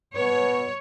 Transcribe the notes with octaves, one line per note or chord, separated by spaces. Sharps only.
B2 B4 C#5